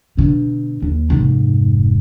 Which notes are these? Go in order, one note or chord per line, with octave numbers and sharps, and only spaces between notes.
B2 D3
D#2
F1 G#2